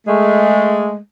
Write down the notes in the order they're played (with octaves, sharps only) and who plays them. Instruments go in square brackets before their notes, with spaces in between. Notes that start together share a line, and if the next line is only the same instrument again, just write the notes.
[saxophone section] G#3 A3